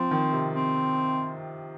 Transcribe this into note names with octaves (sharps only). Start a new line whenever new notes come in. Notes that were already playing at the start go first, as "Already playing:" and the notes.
Already playing: F3 C4
D#3
C3
C4